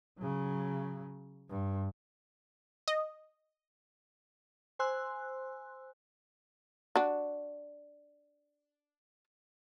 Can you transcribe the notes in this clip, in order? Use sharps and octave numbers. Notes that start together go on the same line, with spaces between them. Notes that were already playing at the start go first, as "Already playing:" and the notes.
C#3 F#3
G2
D#5
C5 G#5 C6 E6 F#6
D4 F#4